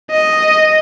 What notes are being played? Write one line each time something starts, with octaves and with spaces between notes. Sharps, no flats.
D#5